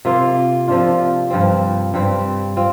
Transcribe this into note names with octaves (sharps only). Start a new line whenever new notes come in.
C3 A#3 F4
C3 F3 D4 F4
G2 F3 C4
G2 G3 C4
C4 F4